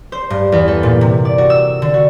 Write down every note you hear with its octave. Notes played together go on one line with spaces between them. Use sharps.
C5
G2
E2
A4
A#2
C3
D5
F#4
E6
D3
F#4